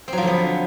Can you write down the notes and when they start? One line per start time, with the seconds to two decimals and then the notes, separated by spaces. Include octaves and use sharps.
0.08 C4
0.13 F#3
0.18 F3
0.23 D3
0.27 B3